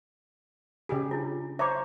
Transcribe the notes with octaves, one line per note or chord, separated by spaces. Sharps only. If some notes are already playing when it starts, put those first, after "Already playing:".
C#3 G4 G#4
D4 E4 F4
C5 C#5 E5 A#5 D6